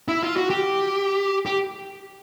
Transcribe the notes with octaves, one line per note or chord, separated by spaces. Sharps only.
E4
F4
F#4
G4
G4